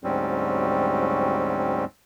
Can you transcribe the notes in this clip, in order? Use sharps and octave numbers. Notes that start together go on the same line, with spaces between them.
D2 G#2 F#3 G3 C4 C#4